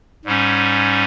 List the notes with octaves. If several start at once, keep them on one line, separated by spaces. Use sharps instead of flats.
G#2 G3 C#4